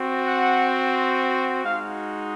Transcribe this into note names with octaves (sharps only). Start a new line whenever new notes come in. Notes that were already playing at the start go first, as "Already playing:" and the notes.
Already playing: C4 F#4
F#5
G#3 D#4 F#4 F5